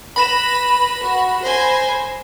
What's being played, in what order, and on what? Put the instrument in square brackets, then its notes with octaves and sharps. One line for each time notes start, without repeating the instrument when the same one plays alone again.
[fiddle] B4 [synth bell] B5 A#6 E7
[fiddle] F#4
C5 G#5